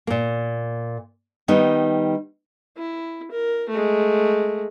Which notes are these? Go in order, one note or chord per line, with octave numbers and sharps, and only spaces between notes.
A#2 A#3
D#3 G3 B3 D#4
E4
A#4
G#3 A3